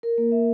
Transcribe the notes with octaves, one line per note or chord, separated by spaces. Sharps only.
A#4
A#3
E5